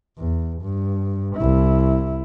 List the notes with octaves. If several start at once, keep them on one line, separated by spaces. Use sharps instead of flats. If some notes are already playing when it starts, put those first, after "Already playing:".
E2
G2
C2 E4